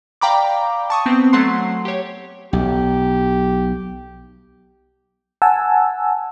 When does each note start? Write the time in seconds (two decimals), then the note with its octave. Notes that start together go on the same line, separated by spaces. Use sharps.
0.21 D5 F5 G5 A#5 B5 D6
0.90 A5 C#6 D#6
1.06 B3 C4
1.33 F#3 A3 F#5 C6 C7
1.85 G4 C#5
2.53 B1 G4
5.42 F#5 G#5 A5 E6